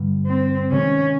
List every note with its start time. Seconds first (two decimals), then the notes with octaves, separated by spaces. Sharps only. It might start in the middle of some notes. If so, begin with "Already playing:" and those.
Already playing: G2 D3 G3
0.26 C4
0.71 C3 D#3 G#3 C#4